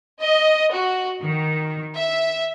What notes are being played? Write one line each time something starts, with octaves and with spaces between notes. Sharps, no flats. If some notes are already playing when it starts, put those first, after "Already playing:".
D#5
F#4
D#3
E5